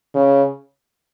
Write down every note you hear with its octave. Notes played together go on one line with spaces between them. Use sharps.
C#3